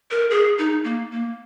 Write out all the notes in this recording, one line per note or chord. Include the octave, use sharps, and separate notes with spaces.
A#4
G#4
D#4
A#3
A#3